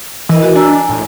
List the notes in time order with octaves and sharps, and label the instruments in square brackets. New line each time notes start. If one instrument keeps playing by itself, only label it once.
[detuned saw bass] E3 [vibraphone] E4 A#4 D#5
[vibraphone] F#4
[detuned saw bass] D4 [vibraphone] G#5 A#5 E6
[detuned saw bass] A2